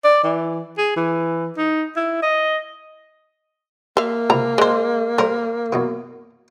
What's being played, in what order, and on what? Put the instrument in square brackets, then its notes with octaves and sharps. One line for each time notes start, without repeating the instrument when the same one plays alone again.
[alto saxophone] D5
E3
G#4
E3
D#4
E4
D#5
[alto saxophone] A#3 [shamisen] E5 F5
[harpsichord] C#2 C3 E4 [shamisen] A#5
[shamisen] G#3 C5 [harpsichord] D5
[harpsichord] G3 A4 C5 [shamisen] A#4
[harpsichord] F#2 B2 E3